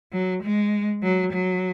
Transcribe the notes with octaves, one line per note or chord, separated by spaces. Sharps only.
F#3
G#3
F#3
F#3